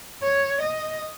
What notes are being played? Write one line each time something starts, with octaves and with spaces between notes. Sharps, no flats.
C#5
D#5